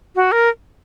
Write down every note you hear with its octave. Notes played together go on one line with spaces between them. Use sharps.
F#4
A#4